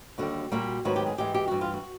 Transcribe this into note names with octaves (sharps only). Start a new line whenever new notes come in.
D#2 D3 G3 F#4
A#2 G3 A#3 F#4
G#2 D#3 F#3 B3 F#4
G4
G#4
G#2 E3 G#3 G4
G4
G2 E3 G3 F#4
F4
F#4